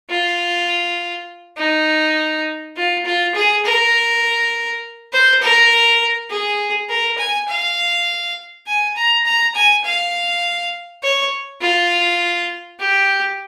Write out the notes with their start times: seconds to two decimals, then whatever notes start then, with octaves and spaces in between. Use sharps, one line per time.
0.10 F4
1.58 D#4
2.77 F4
3.06 F4
3.35 G#4
3.65 A#4
5.13 C5
5.42 A#4
6.30 G#4
6.89 A#4
7.18 G#5
7.48 F5
8.67 G#5
8.96 A#5
9.25 A#5
9.55 G#5
9.85 F5
11.03 C#5
11.61 F4
12.80 G4